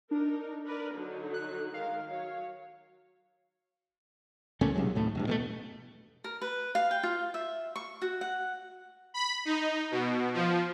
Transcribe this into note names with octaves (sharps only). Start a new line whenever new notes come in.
D4 D#4 A#4
A#4 B4 D5
D3 F#3 D#4
F#6
D#3 G#3 A#4 F5
F#3 C#5
C#2 A#2 A3 C#4
B1 C3 F#3 G#3
D1 D#2 A2 A3
E1 G2
B2 G#3 A3
A#4
B4
F5
G5
F4
E5
C#6
F#4
F#5
B5
D#4
B2
F3